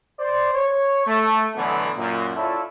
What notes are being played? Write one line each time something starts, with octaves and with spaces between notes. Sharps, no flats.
C5 D5
C#5
A3
B2 D3 E3 F#3 A3 B3
F#2 A#2
E4 F4 A4 C#5 D5 E5